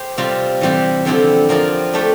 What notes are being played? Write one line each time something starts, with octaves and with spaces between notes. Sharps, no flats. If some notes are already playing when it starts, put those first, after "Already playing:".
Already playing: G4 C5
C3 G3 C4 F4
E3 G3 C4 G4
D3 F3 C4 E4 G4
F3 C4 F4 A#4 D5
A3 D4 G4 D5